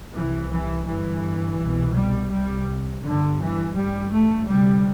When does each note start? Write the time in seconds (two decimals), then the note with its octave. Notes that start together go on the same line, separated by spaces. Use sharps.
0.16 C2 C3 E3
0.52 E3
0.88 G1 G2 E3
1.61 C2 B2
1.96 G3
2.32 C2 C3 G3
3.04 G1 G2 D3
3.40 E3
3.76 A1 G2 G3
4.12 A3
4.48 D2 C3 G3